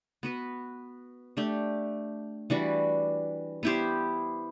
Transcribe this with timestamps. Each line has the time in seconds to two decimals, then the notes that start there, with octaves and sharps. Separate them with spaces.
0.23 B3 F#4 B4
1.37 A3 D4 G4
2.50 E3 G3 D4 F#4
3.63 B3 E4 G4 C5